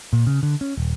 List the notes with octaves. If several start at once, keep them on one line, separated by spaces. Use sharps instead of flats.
A#2
C#3
D3
C#4
D#1